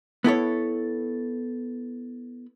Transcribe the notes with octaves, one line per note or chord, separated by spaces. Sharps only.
B3 E4 A4 C#5